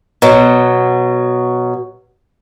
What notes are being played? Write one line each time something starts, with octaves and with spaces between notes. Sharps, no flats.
B2 F#3